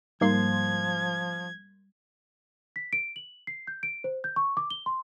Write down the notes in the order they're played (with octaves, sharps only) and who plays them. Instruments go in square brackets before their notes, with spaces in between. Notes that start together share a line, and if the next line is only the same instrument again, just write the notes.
[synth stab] G#2 A#3 C6 [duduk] F3 [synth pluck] G3 [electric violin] G#6
[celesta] B6
D7
F#7
C7
G6
D7
C5
G6
C#6
D6
G7
C6